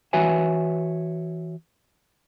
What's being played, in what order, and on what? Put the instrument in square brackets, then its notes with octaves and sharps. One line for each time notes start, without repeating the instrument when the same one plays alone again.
[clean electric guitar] E3 F#4 B4 C#5 E5 G#5